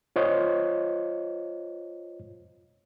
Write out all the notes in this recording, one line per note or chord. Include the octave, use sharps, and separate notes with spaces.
F4 C5 C#5 D#5